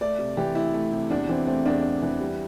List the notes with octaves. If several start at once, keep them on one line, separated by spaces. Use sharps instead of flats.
A3 D5
C3
E3 G4
D2 E4
A3
C3
E2 D4
E3 C4
A3 C4
E2 D4
E2
E3
G3